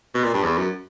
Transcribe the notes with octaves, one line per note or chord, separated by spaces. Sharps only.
B2
A#2
G2
E2
F#2